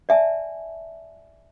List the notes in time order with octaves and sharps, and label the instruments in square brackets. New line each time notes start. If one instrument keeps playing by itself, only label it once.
[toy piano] D5 E5 G#5 A5